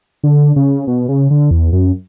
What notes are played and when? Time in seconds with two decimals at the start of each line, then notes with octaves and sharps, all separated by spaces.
0.24 D3
0.56 C#3
0.87 B2
1.09 C#3
1.30 D3
1.51 E2
1.73 F#2